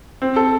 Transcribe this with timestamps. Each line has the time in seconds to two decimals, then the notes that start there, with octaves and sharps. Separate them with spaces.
0.22 C4
0.36 A4